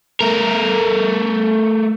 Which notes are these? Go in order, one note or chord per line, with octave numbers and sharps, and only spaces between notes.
A3 A#4